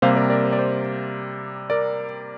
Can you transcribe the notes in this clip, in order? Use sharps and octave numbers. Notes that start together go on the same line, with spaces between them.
C3 G3 A#3 C5 F5
A#4 D5
A#4 D5
C5
D5
C5
A#4 D5